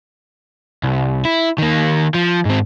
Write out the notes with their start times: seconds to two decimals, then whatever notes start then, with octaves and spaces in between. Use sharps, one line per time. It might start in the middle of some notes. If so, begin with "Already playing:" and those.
0.83 C2
1.25 E4
1.58 D#3 A#3
2.14 F3
2.45 G#2 C4